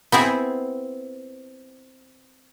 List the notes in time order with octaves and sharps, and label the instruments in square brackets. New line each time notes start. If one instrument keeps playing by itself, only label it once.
[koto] B3 C4 E4 G#4